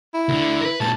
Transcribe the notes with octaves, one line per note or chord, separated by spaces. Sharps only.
E4
D2 D3
A#4 B4
A#2 G#3 A5